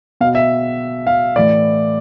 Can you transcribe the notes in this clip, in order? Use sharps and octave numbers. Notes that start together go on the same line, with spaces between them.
B2 F5
E5
F5
A2 E3 D5